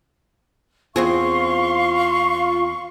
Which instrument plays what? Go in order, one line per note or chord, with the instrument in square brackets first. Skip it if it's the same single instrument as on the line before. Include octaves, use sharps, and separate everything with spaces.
[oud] E2 C4 G#4 [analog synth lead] F4 [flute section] F5 C6 C#6